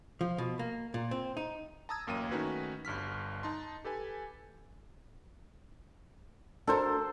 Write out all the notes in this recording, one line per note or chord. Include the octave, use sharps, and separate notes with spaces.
F3
B2
A#3
A#2
C4
D#4
A5 A#5 D#6 E6 G#6
A1 F#2 A#3 G5 D#7
D#3 A3 C#4 D#4 F#4 B4
G1 G2 F6 B6
D#4 A5 C6
G4 A4 B4 G#5
D4 F#4 A4 A#4 C5